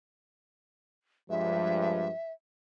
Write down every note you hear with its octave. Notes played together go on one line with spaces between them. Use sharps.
G2 F3 G#3 E5